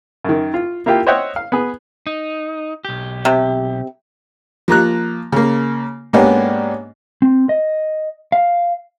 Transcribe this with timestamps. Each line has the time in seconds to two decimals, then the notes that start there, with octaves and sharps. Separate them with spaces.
0.25 F#2 D#3
0.54 F4
0.86 A#3 E4 F4 G4
1.07 C5 C#5 D#5 E5 F#5 G5
1.36 F5
1.52 B3 G#4
2.07 D#4
2.85 B1 G4
3.25 C3
4.68 F3 A#3 A#5 F#6
5.32 C#3 A#3
6.13 G#2 A#3 B3 C#4 D4 G4
7.22 C4
7.49 D#5
8.32 F5